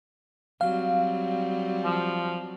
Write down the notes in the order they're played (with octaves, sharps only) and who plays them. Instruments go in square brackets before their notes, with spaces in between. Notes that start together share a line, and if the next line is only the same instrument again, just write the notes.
[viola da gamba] F#3 G3 C4 [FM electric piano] F5
[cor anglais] F3